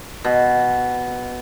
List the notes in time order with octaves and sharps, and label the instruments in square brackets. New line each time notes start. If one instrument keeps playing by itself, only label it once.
[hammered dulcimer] B2